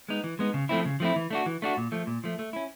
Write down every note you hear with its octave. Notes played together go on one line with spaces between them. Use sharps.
G#3 B3 D#4
E3
G#3 B3 D#4
C#3
F3 A3 C4 E4
C#3
F3 A3 C4 E4
E3
A3 D4 F#4
E3
A3 D4 F#4
A#2
F3 A3
A#2
F3 A3
A3
C#4 E4